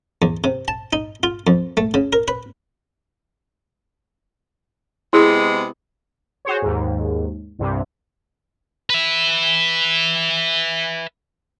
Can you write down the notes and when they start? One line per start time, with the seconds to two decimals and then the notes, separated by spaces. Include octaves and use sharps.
0.22 E2
0.44 C3
0.68 A5
0.93 D#4
1.23 F4
1.47 F2
1.77 A3
1.94 C#3
2.13 A#4
2.28 B4
5.13 C3 G#3 B3 E4 G#4
6.45 F#4 G#4 C5 C#5
6.62 D#2 G#2
7.59 C2 G2 C3
8.90 B4 E5